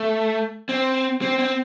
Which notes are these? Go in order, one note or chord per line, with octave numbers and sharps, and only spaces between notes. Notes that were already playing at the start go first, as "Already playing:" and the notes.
Already playing: A3
C4
C4
C4